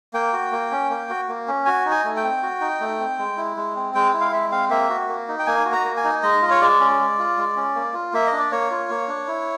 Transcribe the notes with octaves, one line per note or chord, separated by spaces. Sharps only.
A#3 G5
F#4
A#3
C#4
A#3
F#4
A#3
C#4
F#4 G#5
D#4
G#5
A3
G5
C4
F#4
D#4
A3
C4
G#3
E4
G#3
C4
G#3 G5
E4
F5
G#3 E5
C4 F5
A#3 E5
F#4
A#3
D#4
G5
A#3 G#5
F#4
A#5
A#3
G#5
D#4
G#3 D#5
F4
C#5
G#3 D5
C#4
G#3
F4
G#3
C#4
A#3
F4
A#3 E5
D#5
D4
D5
A#3 C#5
F4
A#3
D4
E4